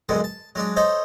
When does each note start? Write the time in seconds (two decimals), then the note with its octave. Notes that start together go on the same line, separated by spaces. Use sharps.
0.09 F#2 B2 D3 G3 G#3
0.24 A5
0.55 F#3 G#3 D4
0.76 D#4 A4 C5 C#5 D#5